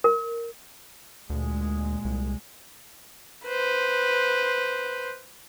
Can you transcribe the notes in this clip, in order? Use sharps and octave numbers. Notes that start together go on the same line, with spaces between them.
A#4
D2 A#2 G#3
C2
B4 C5